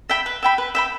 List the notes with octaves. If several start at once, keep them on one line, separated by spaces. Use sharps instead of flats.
E5 G5 B5
B4
E5 G5 B5
B4
E5 G5 B5